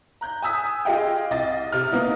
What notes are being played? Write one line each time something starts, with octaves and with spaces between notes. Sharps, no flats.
A#5 F#6 G6
G#5 D#6 E6 B6
F4 G4 G#4 D#5 F5 G5
C2 D#5 A6
C3 F6
A#3 B3 D#4